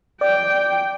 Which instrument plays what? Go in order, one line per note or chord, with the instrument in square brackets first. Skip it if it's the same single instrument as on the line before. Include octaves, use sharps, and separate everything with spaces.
[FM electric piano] D5 [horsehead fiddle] G5